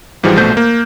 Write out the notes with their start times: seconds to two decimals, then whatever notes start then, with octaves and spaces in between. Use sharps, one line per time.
0.23 G#2 E3 F3 G3 G#3
0.36 A#1 B2 A3 C5 G6
0.57 A#3